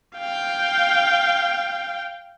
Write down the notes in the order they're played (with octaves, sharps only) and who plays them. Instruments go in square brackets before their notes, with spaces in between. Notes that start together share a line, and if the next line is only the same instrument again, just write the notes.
[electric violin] F5 G5